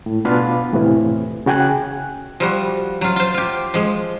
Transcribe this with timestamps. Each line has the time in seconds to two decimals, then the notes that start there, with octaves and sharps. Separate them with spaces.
0.06 A2
0.25 B2 B3 D4 F4 B4 F5
0.73 E2 A2 C3 E3
1.46 C#3 F#4 G5 G#5 F#6
2.40 F3 G3 F#4
3.01 F#3 F4
3.16 F4 C5
3.34 F4 G4
3.74 F3 G#3